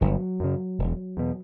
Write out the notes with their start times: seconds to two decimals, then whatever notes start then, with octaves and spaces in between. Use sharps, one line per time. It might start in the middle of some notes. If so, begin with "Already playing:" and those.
0.01 G1 F#3
0.40 F#2 C#3
0.79 E1
1.17 E2 B2